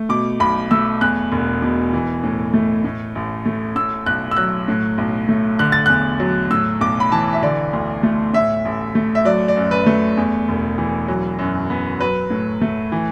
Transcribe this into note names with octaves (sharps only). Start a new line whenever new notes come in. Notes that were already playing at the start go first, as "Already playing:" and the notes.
Already playing: A3
B2 D6
B1 B5
A3 E6
E2 F#6
E1
B2
E3
A2
A3
A2
A1
A3
A2 E6
B1 F#6
E6
F#3 F#6
A2
B1
A3
D3 F#6
A6
E2 F#6
F#3
A2 E6
B1 D6
B5
E3 A5
E5
D3 D5
D2
A3
A2 E5
A1
A3
E5
F#3 D5
D5
F#2
B4
A3
E2
E1
E3
F#3
F#2
B3
F#3 B4
A2
A3
E3